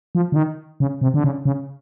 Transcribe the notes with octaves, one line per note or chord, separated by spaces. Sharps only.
F3
D3
D#3
C#3
C3
D3
C#3
C#3